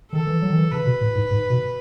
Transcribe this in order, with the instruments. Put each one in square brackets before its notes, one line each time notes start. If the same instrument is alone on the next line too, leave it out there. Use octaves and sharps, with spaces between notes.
[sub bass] D#3 [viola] A4
[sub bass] E3
F#3
D#3
E3
[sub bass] C#3 [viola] B4
[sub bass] B2
A2
G#2
G#2
B2